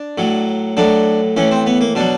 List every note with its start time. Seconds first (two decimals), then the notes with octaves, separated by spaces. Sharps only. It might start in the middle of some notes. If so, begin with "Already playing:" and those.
Already playing: D4
0.18 A2 F#3
0.77 A2 F#3 D4
1.37 A2 E3 C#4
1.51 C4
1.66 B3
1.81 A#3
1.95 B2 F#3 D4